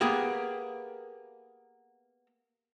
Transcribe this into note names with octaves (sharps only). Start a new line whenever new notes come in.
A#3 B3 G4 G#4